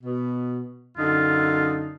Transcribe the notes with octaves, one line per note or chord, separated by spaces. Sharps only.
B2
F#2 D3 D#4 F4